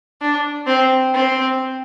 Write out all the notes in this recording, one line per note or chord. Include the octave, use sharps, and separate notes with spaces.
D4
C4
C4